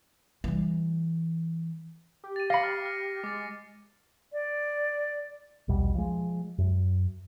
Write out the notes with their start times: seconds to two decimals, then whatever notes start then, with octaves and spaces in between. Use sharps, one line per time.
0.44 E3 G3
2.24 G4
2.36 A6 D#7
2.50 F5 B5 A#6 C7 C#7
2.63 F6 A6
2.86 F6
3.24 G#3 D6 A6
4.33 D5
5.68 A#1 D#2 B2 G3
5.95 F3 G#3
6.58 F#2